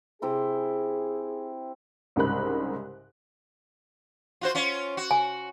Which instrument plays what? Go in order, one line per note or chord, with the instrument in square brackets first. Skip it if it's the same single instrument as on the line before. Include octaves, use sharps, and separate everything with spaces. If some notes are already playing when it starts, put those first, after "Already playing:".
[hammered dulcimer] C3 E4 C6 [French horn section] G#4
[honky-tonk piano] C2 G#2 C#3 A#4 B5 F#6
[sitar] F4 F#4 C5
C#4 F4
F#4
[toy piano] G#5